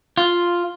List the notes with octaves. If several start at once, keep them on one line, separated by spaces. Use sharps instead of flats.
F4